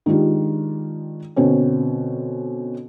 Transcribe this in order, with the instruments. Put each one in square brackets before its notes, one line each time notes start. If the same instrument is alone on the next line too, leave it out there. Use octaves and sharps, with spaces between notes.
[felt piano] D#3 G#3 D4 F4 G4
B2 D3 C4 C#4